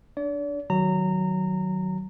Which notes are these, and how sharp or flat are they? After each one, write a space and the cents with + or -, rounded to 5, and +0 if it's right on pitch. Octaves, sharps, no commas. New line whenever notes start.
D4 +0 D5 -40
D#3 +0 F#3 +10 A#5 -20